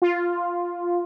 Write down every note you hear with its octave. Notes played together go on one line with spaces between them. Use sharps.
F4